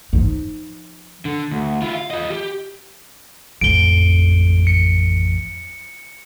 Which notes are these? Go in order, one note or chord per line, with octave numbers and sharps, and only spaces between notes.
F3 D#4
D3
D2
E4 F4
F5
F4 D#5
G4
A1 F2 D7 G7
C#7